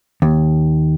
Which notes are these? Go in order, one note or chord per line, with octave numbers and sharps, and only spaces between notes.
D#2